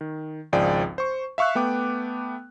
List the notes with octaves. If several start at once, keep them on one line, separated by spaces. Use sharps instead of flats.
D#3
G#1 C#2 F3 G#4 D5 G5
C5 C#6
E5 F5 C#6 E6 F#6
A3 B3 G5 D6